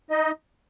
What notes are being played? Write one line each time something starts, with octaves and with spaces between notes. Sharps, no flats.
D#4 D#5